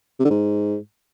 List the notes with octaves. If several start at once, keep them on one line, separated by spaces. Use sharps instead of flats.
C3
D3
G#2